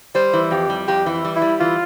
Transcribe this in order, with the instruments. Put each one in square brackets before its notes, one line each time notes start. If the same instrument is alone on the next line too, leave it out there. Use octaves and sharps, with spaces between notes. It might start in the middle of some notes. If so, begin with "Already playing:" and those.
[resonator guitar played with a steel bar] G3 [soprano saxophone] C5
[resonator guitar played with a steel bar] E3
[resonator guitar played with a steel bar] F2 [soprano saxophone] G4
[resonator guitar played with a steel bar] G3
[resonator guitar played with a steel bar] F2 [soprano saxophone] G4
[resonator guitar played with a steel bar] E3
G3
[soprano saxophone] E4
[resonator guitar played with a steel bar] G3
[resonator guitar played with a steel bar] E3 [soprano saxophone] F4